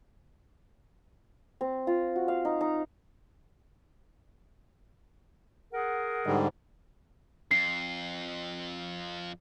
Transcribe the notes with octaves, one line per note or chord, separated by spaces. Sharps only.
C4
F4
F#4
F5
D#4
D#4
G#4 A#4 F#5
G#2 D3 G3
F2 C7